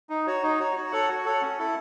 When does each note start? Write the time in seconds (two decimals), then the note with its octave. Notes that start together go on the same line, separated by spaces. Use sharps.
0.10 D#4
0.27 F#4 C#5
0.43 D#4
0.60 F#4 C#5
0.76 F#4
0.92 A4 C#5 F#5
1.09 F#4
1.25 A4 C#5 F#5
1.42 C#4
1.58 E4 A4